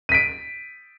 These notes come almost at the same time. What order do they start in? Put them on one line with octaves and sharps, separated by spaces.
D#7 B6 D7